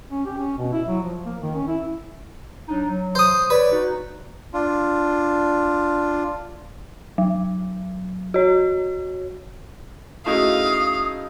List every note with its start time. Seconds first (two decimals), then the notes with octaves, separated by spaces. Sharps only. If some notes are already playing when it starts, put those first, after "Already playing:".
0.11 C#4
0.26 G4
0.38 C#4
0.58 B2
0.72 E4
0.88 F#3
1.03 F3
1.26 A#3
1.41 D#3
1.54 C#4
1.68 E4
2.68 F#3 D4 D#4
2.89 F#3
3.15 C5 D#6
3.50 B4 C#5 D5
3.71 D#4 F#4
4.54 D4 F4
7.18 F#3
8.34 F#4 C#5
10.26 A3 C#4 D#4 E4 F#4 G#4 F5 D#6